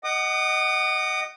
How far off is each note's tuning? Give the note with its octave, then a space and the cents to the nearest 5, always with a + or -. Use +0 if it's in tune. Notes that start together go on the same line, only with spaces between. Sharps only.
D#5 +0 F#5 +25 D#6 -35